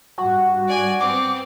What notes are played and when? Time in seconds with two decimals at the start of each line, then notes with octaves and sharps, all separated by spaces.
0.18 G2 G3 F#4
0.68 D5 G#5
1.00 B3 C4 D6